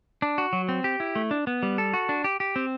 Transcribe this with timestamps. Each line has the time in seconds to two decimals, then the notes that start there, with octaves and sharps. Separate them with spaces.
0.22 D4
0.38 F#4
0.53 F#3
0.69 C4
0.84 G4
1.00 E4
1.16 A3
1.31 D4
1.47 B3
1.63 G3
1.78 A4
1.94 F#4
2.09 D4
2.24 G4
2.40 G4
2.56 C4